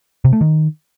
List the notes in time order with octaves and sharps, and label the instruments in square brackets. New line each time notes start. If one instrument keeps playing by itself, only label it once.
[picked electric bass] C3
A3
D#3